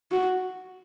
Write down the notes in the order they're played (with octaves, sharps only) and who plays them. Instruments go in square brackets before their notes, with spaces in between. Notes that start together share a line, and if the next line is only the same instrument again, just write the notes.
[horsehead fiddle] F#4